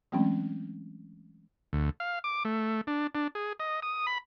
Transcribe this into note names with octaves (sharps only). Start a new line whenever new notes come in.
E3 F#3 G#3 A3 C4 C#4
D2
F5
D6
A3
D4
D4
G#4
D#5
D#6
B5